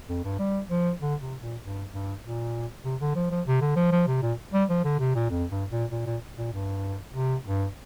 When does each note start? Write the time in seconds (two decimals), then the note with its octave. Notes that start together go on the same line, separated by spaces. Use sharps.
0.09 F2
0.25 G2
0.39 G3
0.70 F3
1.01 D3
1.21 C3
1.42 A#2
1.62 G2
1.92 G2
2.24 A#2
2.85 C3
3.01 D3
3.15 F3
3.31 F3
3.47 C3
3.61 D3
3.76 F3
3.92 F3
4.07 C3
4.22 A#2
4.53 G3
4.69 F3
4.84 D3
5.00 C3
5.15 A#2
5.30 F2
5.50 G2
5.70 A#2
5.92 A#2
6.06 A#2
6.38 A#2
6.53 G2
7.14 C3
7.45 G2